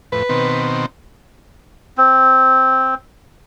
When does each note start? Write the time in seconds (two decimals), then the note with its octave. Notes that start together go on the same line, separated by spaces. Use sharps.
0.12 F2 A2 B4
0.29 B2 D#3 C4
1.98 C4